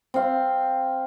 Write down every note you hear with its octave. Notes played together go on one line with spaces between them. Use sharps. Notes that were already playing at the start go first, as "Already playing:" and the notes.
C4 F5